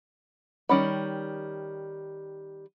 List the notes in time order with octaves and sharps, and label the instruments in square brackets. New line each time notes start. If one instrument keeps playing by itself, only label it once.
[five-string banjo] D#3 G3 C#4 B5